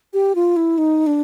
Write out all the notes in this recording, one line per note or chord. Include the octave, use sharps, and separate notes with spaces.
G4
F4
E4
D#4
D4